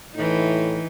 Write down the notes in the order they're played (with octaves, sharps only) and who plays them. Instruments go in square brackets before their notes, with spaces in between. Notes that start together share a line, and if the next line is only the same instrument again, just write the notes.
[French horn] A2 [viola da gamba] E3 D#4